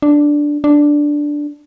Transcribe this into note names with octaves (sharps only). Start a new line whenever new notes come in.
D4
D4